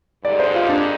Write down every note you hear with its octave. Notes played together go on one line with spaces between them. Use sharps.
G2 D3 G#3 D#4 G4 D5
C5
F4
D4